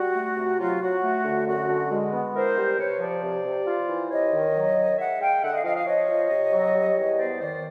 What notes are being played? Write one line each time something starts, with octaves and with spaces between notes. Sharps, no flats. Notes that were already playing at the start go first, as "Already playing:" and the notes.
Already playing: G3 F#4
A3
C3
F#3 F4
F#3 F#4
A3
D3
F#2 F#4
D3
G#3
B3
E4 A#4 C5
G3
C3 B4 C#5
F3 C5 D5
C3
C3
F4
E3
C3 C#5 D#5
D#3
F#3
D#3
G#3 E5 F#5
G#3 F5 G5
D3 E5 F#5
D#5 F5
F3 D#5 F5
D#5 F5
F3 C#5 D#5
F3
C3
F#3
G3
E2
B3 C5 D5
D#3 C5 D5